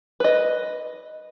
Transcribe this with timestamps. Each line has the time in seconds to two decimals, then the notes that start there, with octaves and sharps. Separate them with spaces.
0.20 B4 D#5